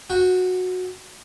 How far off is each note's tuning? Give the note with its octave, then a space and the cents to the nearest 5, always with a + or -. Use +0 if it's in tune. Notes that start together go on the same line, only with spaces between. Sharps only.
F#4 -15 G5 +0